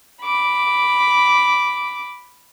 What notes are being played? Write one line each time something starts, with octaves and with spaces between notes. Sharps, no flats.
B5 D6